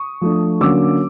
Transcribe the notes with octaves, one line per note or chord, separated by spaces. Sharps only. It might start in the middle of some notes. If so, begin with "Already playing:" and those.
Already playing: C#6 D#6
F3 A3 D4
D3 F#3 A#3 C#4 D6 E6